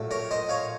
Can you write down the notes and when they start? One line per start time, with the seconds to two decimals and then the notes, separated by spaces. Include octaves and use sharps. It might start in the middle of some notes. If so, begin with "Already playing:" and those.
Already playing: A#1 A2 F#3 A3
0.11 A#4 C#5
0.31 C5 D#5
0.49 C#5 F5